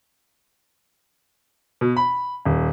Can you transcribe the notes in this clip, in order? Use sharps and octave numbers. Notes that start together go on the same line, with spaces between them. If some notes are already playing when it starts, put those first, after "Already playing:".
B2
B5
D#1